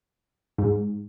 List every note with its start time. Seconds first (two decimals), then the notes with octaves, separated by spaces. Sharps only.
0.58 G#2